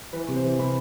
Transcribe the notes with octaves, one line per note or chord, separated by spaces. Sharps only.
E3 B4
C3
C5
E3
C3 B5